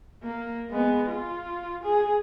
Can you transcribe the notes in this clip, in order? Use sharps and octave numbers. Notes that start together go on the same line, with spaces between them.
A#3
G#3 B3
F4
G#4